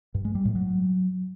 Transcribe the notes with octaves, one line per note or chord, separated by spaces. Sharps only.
G2
G#3
G3
A2
F#3